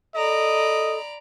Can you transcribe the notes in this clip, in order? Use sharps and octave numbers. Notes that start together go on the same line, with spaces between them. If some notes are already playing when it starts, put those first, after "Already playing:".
A4 D5 D#5 A#5 B5